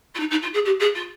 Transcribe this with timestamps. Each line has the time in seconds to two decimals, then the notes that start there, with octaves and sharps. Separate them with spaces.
0.14 F4
0.19 D#4
0.30 D#4
0.42 F4
0.53 G#4
0.65 G4
0.79 G#4
0.94 F4